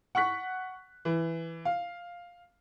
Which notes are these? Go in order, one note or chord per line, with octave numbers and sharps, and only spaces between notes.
F#5 C#6 F#6 B6
E3
F5